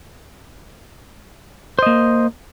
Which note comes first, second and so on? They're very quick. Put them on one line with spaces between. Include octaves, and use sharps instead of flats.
C5 D#5 A#3